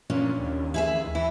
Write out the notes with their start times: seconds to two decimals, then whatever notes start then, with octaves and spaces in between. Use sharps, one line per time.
0.10 A#2 C#4 D4
0.39 D#2
0.74 E4 G#4 E5
1.15 E3 E4